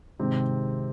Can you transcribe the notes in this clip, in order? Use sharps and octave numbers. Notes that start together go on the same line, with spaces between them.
G#1 G#2 C3 D#3 C4